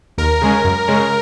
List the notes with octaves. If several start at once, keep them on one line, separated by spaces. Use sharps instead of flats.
D#2 A#4
C#3 G#3 C#4
F#2
C#3 G#3 C#4